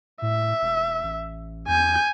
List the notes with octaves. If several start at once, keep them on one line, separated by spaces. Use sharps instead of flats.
A2 E5
E1
A1
E2 G#5 G6